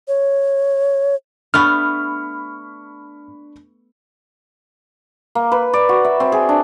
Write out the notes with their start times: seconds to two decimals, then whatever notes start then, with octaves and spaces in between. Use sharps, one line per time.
0.08 C#5
1.54 A3 B3 D4 B5 C#6 F6
5.35 A#3
5.52 B4
5.73 D5
5.89 F#4
6.04 E5
6.20 C4
6.32 G#4
6.49 D4